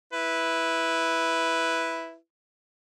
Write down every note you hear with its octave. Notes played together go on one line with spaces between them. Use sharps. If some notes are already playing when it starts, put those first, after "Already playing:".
E4 B4